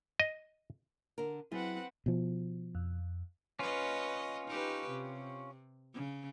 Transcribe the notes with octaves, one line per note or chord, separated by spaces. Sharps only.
D#5
D3 A#4
F#3 C4 E4 G#4 B4 F#5
B2 F3
F2
C#4 F4 B4 C#5 D#5
D#4 G4 B4
C3
C#3